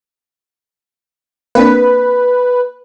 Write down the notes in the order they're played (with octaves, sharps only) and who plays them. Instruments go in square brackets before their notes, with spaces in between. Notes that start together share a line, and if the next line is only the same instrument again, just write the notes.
[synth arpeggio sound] A#3 C4 D4 [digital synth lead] B4